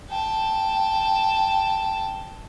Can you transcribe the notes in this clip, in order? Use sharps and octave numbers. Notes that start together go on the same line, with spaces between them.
G5 A5